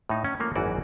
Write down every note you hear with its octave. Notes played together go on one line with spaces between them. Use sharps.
A2 D#4
C#4
F3 A3 A#3
G#1 F#2 E3 D#4 F#4 D5